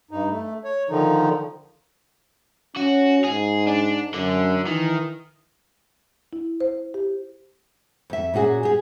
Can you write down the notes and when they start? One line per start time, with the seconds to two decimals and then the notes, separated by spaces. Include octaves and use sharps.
0.11 G2 D#4
0.30 A3
0.65 C#5
0.90 D3 D#3 F3 D#4
2.76 C#4 F#4
3.24 G#2 G#4
3.67 D4
4.14 F#2 D3
4.66 D#3 E3
6.33 E4
6.60 C5
6.94 G4
8.10 F2 E5
8.34 A#2 C#4 F#4 G#4
8.63 G4 G#4